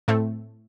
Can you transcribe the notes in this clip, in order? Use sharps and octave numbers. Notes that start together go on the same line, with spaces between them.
A2 A3 C4